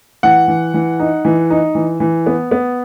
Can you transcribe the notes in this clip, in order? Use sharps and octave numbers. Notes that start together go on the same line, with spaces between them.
E3 F#5
E3
E3
D#4
E3
D#4
E3
E3
B3
B3